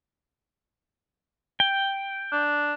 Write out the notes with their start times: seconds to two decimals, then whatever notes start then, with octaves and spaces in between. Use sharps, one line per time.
1.60 G5
2.32 D4